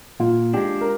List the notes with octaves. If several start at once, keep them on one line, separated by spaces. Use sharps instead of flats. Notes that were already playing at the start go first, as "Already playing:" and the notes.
A#2 F4
G#3 D4 G4
A#4